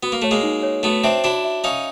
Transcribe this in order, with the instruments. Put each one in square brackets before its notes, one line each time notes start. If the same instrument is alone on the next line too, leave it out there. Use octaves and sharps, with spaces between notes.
[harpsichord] B3 [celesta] F#4
[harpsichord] A#3
[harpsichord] A3 [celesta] C#5
[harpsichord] G#3 A#3
[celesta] D#4
C#5
[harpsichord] A3 B3 [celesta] F#4
[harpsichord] C4 D4 [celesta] E5
[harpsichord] D4 E4 [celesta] F#4
[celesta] E5
[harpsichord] C#4 D#4 [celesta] F5